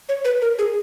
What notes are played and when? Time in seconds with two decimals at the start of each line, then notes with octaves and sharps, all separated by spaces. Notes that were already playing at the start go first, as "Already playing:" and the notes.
0.09 C#5
0.25 B4
0.42 A#4
0.59 G#4